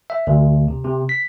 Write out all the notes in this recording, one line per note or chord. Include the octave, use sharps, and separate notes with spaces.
E5
D2
C3
C3
B6